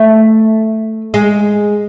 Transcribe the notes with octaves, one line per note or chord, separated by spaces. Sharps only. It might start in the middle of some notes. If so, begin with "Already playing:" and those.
Already playing: A3
G#3